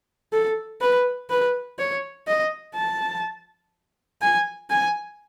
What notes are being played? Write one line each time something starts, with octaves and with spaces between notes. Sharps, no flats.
A4
B4
B4
C#5
D#5
A5
G#5
G#5